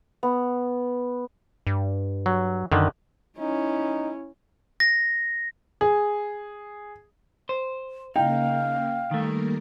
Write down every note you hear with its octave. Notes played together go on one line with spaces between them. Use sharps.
B3
G2
F#3
F#2 D3 D#3
C#4 D#4 E4
A#6
G#4
C5
C#3 A#3 D#4 F5 G5
D#3 G3 A3 A#3 A#4